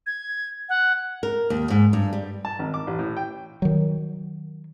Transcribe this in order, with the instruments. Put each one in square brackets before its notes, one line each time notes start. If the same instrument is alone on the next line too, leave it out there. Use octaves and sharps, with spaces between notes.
[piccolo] G#6
F#5
[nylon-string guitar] A#4
D#2
G#2
G2
G3
[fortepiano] A5
G#1
D6
A1
A2
G5
[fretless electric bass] D#3 F#3